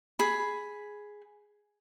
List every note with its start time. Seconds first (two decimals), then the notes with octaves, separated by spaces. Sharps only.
0.19 G#4 B5